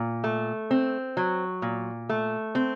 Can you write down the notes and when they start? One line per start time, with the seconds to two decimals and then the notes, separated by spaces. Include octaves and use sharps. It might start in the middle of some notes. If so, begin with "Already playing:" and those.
Already playing: A#2
0.24 A3
0.71 C4
1.17 F#3
1.62 A#2
2.09 A3
2.55 C4